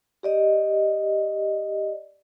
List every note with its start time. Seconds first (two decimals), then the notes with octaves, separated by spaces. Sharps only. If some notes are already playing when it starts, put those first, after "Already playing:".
0.23 G4 D5 D#5